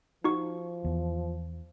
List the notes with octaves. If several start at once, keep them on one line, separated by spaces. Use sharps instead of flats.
F3 D#4 F#4 C#6
E2